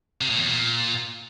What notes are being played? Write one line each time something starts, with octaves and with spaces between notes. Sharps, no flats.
C3
A2
E2
A#2